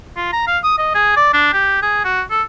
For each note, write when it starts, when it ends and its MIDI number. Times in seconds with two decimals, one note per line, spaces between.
0.17 0.31 65
0.33 0.44 82
0.48 0.58 77
0.64 0.78 87
0.79 0.91 75
0.95 1.15 68
1.17 1.30 74
1.34 1.51 62
1.53 1.80 67
1.82 2.02 68
2.05 2.22 66
2.30 2.42 69